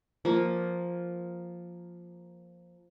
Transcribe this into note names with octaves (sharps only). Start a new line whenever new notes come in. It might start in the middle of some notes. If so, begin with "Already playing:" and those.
F3 A#3